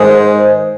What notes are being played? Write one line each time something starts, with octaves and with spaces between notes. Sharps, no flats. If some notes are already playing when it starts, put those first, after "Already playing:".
Already playing: G#2 D#3 G#3 C5